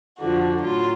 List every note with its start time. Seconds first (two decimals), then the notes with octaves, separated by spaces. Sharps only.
0.21 F2 D3 F3 F#4
0.62 A2 F#3 F4